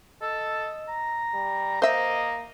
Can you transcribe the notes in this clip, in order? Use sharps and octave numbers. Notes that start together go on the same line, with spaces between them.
A4 D#5
A#5
G3
A#3 C5 D#5 E5